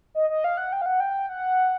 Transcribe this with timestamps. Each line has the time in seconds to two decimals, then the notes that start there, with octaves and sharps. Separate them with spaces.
0.15 D#5
0.30 D#5
0.44 F5
0.57 F#5
0.73 G5
0.82 F5
0.86 F#5
1.00 G5
1.29 F#5